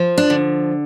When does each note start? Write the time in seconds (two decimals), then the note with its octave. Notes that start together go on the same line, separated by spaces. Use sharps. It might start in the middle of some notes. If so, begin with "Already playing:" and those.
Already playing: F3
0.18 D4
0.30 D3